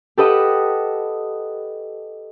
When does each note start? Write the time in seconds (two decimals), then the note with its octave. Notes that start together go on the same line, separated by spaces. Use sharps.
0.18 G4 A4 B4 D#5 F#5